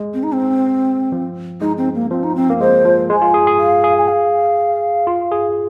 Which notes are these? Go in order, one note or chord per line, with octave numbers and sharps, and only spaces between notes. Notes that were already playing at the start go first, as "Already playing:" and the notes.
Already playing: G#3
C4
D#4
C4
F3
G#3 D#4
C4
A#3
F3 C4
D#4
C4
A#3
G#3 C5
F3
G#3 G#5
F4
G#4
G#4
F5
G#4
G#5
F5
F4
G#4